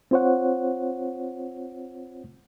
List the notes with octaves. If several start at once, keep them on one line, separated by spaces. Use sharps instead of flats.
C4 F4 C5 C#5 F#5